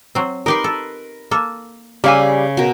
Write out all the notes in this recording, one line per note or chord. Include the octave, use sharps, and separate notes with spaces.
F#3 C4
D#4 G4 A#4 B4 C6
A4
A#3 A4
C#3 G3 A#3 C#5 E5 F5 G#5
B2 A#4